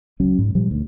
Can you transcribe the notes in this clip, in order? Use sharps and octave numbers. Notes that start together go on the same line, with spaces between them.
C#2 F#3 C#4
G#2
A#2 F3 G3
D2